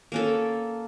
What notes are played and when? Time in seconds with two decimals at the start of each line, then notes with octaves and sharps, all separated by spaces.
0.12 A#3 C#4 A4